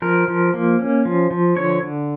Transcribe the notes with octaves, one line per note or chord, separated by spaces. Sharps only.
F3 A#4
F3
A#3
C#4
F3
F3
D3 C#5
D3